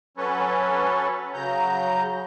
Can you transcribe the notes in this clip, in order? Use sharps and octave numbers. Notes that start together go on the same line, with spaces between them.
F#3 C#4 A4 B4 C#5
C#3 F#3 A#5 G6